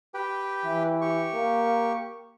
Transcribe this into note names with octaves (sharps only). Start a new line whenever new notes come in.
G4 B4 G5
E3
G4 C#6
A#3